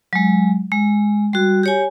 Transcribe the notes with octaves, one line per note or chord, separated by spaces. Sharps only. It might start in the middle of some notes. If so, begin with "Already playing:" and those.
F#3 G#3
G#3
G3 F#4
G4 C#5 G#5